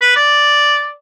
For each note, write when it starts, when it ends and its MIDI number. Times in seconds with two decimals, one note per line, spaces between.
0.01 0.14 71
0.16 0.91 74